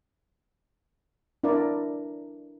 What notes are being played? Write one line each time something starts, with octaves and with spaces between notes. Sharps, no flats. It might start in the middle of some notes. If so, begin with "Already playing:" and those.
D4 E4 A#4 D5